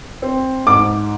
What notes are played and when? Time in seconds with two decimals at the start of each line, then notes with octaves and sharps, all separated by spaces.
0.22 C4
0.67 G#2 D6